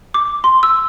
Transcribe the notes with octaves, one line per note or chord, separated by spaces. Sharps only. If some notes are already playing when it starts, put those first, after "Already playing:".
D6
C6
E6